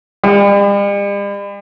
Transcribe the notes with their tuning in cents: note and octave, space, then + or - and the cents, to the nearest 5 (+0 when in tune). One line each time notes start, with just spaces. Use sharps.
G3 +45